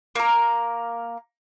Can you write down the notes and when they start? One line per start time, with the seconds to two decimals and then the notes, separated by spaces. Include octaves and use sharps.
0.15 A#3 A#4